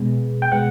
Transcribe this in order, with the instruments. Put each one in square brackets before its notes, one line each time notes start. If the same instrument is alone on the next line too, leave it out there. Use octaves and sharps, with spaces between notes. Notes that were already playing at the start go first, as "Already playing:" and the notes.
Already playing: [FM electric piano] B2 G#3 B3
G5
B2 G#3 B3 F#5